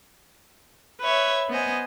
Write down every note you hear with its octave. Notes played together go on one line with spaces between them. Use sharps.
B4 C#5 E5
B3 C5 D#5 G#5